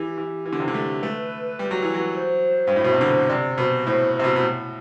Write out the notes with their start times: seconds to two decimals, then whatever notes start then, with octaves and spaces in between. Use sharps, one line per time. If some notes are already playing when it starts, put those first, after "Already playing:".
Already playing: E3 G4
0.18 E3
0.46 E3
0.52 D3
0.60 C3
0.68 D3
0.74 A3
1.02 A3 B4
1.59 G3
1.71 F#3
1.82 E3
1.94 F#3
2.16 C5
2.67 G2
2.76 A2
2.84 B2
2.93 C3
3.01 D3
3.29 C3 D5
3.58 B2 C5
3.87 A2 C5
4.15 C3 C5
4.24 B2
4.36 B2
4.43 A2